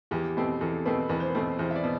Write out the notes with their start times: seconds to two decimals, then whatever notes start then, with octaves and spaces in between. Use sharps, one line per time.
0.11 E2 G4
0.37 B2 A3 C4
0.61 E2 A4
0.85 B2 A3 C4 B4
1.09 E2 B4
1.20 C5
1.30 B4
1.35 B2 A3 C4
1.59 E2 C5
1.71 E5
1.75 D5
1.84 B2